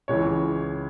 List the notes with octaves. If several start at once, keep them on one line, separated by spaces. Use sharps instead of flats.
C#2 C#3 E3 C#5